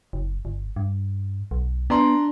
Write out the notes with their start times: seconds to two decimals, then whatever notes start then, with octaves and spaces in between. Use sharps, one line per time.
0.13 F#1
0.45 G1
0.76 G2
1.51 B1
1.90 B3 D4 A#5 C6